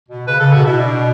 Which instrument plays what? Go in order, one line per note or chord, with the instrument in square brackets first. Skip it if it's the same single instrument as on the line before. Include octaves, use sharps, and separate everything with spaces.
[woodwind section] B2
[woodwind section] C#3 [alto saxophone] B4
[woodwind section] C#3 [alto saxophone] A4
[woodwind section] B2 [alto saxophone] F#4
[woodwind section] B2 [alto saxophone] E4
[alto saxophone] D4